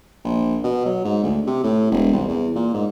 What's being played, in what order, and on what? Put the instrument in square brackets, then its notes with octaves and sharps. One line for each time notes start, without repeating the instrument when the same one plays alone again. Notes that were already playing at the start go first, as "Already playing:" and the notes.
[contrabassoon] A#1
B2
F#3
G#2
D2
C3
A2
E1
C2
E2
A#2
G#2